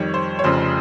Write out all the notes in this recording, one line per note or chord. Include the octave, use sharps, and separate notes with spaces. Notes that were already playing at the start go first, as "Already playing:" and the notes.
Already playing: F2 D#3 G3 C#5
C5
C#5
F1 F2 C#3 F3 C5